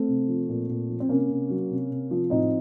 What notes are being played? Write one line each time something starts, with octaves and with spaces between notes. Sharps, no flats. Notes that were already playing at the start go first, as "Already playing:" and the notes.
Already playing: A3 C4
C3
F3
A#2
A#2
F3
C4
C3 A#3 C#4
C3
F#3
C3
C3
F3
A2 C4 D#4